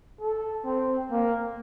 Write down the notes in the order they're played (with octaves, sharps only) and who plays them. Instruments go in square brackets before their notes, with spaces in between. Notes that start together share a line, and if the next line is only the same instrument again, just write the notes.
[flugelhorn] A4
C4
A#3